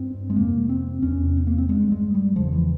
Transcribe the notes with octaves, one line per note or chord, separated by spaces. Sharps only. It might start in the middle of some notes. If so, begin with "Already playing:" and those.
Already playing: G2 C4
G#3
F2 C3 A#3
C4
E2 C3 C#4
C4
A#3
C4
G2 G#3
G#3
G3
E2 C#3 F3
E3